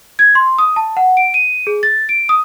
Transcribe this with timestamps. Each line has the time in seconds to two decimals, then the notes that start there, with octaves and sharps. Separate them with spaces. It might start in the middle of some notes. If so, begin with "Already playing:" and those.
0.19 G#6
0.35 C6
0.58 D#6
0.76 A5
0.97 F#5
1.17 D7
1.34 D#7
1.67 G#4
1.83 A6
2.09 D7
2.29 D#6